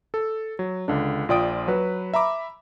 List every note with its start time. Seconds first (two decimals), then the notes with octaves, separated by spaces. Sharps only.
0.14 A4
0.59 F#3
0.88 C#2 D3 D4
1.29 A#1 F4 D5 G5 D#6 D7
1.68 F#3 B4
2.14 E5 A#5 B5 D6